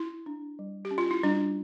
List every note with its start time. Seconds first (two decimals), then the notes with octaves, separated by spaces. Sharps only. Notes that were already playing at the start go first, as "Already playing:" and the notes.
Already playing: E4
0.26 D4
0.59 G3
0.85 G4
0.91 C#4
0.98 F4
1.11 E4
1.23 G3 D4